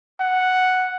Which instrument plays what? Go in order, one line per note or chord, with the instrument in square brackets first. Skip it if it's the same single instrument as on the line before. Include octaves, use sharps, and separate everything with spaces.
[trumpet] F#5